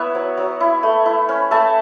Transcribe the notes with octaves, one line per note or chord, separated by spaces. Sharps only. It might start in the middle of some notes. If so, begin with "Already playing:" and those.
Already playing: B3 E4 C#5 E5 F#5
F#3
F#3
E4
A3
E4
C#4
A3 E5 A5